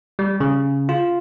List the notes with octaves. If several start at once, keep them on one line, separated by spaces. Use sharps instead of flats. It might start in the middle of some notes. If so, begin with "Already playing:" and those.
G3
C#3
F4